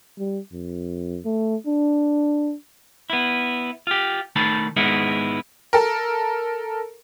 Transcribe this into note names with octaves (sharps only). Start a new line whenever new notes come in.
G3
F2
A3
D4
B3 E4
F4 G4
D#3 A3 D#4 A5 B5
G#2 D#3 G#3 B3 D#4 E4
A4 A#4